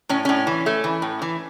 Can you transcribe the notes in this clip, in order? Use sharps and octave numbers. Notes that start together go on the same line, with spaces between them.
A2 C#4
A2 C#4
E3
A3
E3
A2
E3